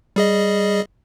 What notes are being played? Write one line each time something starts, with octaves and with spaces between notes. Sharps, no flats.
G3 G#4 D#5